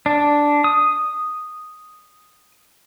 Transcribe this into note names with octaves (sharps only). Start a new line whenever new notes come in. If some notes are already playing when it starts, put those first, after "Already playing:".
D4
D#6